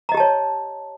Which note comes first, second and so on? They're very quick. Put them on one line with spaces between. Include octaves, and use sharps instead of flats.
A#5 D#5 G4 A5 C#5